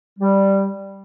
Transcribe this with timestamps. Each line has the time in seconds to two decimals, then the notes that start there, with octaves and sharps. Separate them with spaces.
0.19 G3